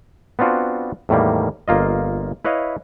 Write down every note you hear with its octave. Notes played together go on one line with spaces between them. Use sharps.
B3 C4 D4 F4 F#4
E2 A2 D#3 G3 A#3
G1 A#3 F4 D#5
E4 B4 C#5 D#5 F5